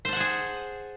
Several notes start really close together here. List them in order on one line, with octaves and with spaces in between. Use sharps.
C5 A5 F#5 G#5 G#4